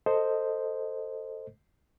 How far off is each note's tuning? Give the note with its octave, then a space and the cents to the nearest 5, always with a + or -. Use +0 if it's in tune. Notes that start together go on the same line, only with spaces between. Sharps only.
A4 +15 C5 +0 D#5 +0